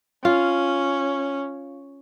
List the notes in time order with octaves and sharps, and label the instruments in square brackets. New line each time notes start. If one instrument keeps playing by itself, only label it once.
[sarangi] C#4 [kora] F4